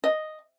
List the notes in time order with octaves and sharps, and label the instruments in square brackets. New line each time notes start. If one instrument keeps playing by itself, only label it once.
[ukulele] D#5